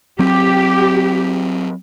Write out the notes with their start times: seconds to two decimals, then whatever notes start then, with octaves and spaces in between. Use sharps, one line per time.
0.19 F#3 C4 G4